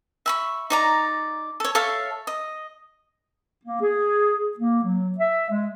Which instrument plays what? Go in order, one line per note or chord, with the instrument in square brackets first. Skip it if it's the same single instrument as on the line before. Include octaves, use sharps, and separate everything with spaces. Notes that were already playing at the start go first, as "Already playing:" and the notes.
[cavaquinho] E5 B5 C#6
D#4 D5 A#5
A4 C#5
A4 C#5 E5 F5
D#5
[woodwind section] A#3
G#4
A#3
F#3
E5
G#3